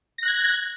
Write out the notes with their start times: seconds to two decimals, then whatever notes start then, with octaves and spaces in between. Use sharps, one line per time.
0.18 A#6
0.23 F#6
0.28 G#6